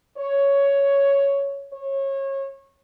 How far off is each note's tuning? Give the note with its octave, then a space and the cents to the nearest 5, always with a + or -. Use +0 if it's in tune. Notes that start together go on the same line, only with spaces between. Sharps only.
C#5 +5
C#5 -25